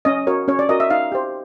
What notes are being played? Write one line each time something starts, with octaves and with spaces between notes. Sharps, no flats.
C#4 D#5
F#4 A#4 C#5
C#4 C#5
D5
F#4 A#4 D#5
E5
D#4 F5
G4 C5